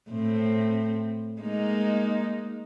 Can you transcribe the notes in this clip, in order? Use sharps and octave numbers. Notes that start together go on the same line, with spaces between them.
A2 C4
G#3 A#3 D#4